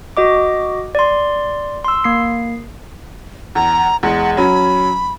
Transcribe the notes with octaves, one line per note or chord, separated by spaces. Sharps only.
F#4 D#5 D6
D5 C6
C6 E6
A#3 C7
E2 A#5
E2 G#3 F#5
F#3 C#4 B5